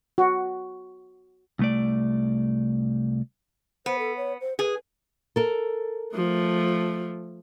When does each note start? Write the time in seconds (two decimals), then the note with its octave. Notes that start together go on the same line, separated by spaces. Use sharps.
0.18 F#4
1.59 C2 A3 D5
3.86 B3 C5
3.99 A4
4.17 C#5
4.41 C5
4.59 G#4 B4
5.36 A4 A#4
6.15 F3 A3